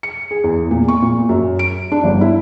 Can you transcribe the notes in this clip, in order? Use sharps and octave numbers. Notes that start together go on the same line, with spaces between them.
C#7
G#4
E2
A#2
C#6
A#2
F#2
D7
D4
G1
E4